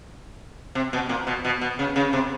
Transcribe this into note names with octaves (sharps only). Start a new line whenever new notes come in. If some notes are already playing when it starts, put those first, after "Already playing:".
C3
B2
A#2
B2
B2
B2
C#3
C#3
C3